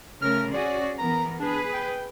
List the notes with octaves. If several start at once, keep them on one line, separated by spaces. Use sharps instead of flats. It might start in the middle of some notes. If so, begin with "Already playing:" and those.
C#3 A3 A#4 F6
C#4 F#4 G#4 D5
E3 B3 A#4 A#5
D4 G#4 B4
G5